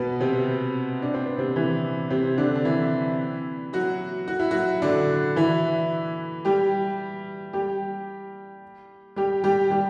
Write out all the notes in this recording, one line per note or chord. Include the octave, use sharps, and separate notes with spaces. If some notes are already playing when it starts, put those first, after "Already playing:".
Already playing: B2 B3
C3 C4
D4
C4
B3
C3 C4
E3 E4
C3 C4
D3 D4
D4
E3 E4
F#3 F#4
F#4
E4
F#3 F#4
D3 D4
E3 E4
G3 G4
G3 G4
G3 G4
G3 G4
G3 G4